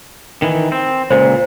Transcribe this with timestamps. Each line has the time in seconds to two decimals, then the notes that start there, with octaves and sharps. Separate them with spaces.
0.42 D#3 E3
0.72 C4
1.11 C#2 A#2 C5